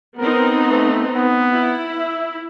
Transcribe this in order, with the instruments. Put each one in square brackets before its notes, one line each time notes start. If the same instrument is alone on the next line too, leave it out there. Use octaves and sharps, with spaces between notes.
[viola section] B3 C4 D#4 [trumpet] A#4
[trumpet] A3
B3
[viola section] E4
[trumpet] E5